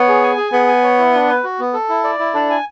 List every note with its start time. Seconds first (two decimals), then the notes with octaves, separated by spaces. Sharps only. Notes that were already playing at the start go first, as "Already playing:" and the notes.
Already playing: B3 C#5
0.08 G#4
0.22 G#5
0.37 G#4
0.52 B3 G#4
0.67 G#5
0.83 C#5
0.98 E4
1.14 D4
1.28 B4
1.44 F#4
1.59 B3
1.74 A4
1.89 E4
2.04 D5
2.19 E4
2.34 D4 A4
2.50 G#5